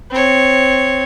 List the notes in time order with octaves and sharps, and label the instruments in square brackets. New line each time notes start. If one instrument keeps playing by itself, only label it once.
[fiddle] C4 C#5